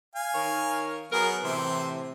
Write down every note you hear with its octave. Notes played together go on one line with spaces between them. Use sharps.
F5 G#5
D#3 A#4 C#5
F#3 B3 G#4 A#4
A2 C3 E3 C5